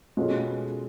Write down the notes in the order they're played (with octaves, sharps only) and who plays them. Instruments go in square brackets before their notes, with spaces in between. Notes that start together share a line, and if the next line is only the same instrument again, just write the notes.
[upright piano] B2 G#3 C#4 F4 A4